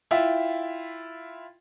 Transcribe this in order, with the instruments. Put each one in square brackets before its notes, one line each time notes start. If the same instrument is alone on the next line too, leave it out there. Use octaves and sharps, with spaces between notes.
[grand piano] E4 F4 E5 G5